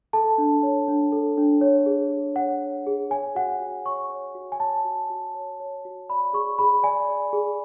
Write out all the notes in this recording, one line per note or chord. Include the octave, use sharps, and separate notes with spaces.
A4 A5
D4
C#5
D4
A4
D4
C#5
G#4
G#4
C#5 F#5
C#5
G#4
C#5 G#5
F#4 F#5
F#4
C#5 C#6
C#5
F#4
G#5
C#5 A5
F#4
F#4
C#5
C#5
F#4
D5 B5
G#4 C#6
G#4 B5
D5 G#5
D5
G#4